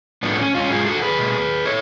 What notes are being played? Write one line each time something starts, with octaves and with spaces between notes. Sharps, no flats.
A2 F3 A3 B3 D4
C#4
C#4 F4
G#2 G#3 F4 G#4
F#4 A4
G#4 B4
B2 A3
A4 C#5